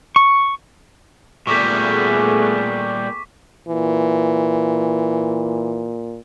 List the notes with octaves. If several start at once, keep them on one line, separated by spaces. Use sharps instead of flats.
C#6
A#2 G3 A3 B3 G#4 C#6 D6 B6
A#2 E3